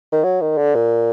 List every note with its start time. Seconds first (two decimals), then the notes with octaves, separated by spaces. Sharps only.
0.12 D#3
0.24 F#3
0.41 D#3
0.58 D3
0.75 A#2